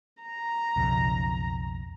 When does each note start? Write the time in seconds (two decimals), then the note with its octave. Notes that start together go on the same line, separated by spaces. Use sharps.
0.22 A#5
0.76 B1 F2 C#3